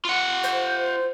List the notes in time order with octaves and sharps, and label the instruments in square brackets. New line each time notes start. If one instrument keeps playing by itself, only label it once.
[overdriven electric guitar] F4 F#5
[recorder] C5